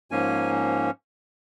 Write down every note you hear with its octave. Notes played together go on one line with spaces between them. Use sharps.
G#2 F3 A#3 C#4 G#5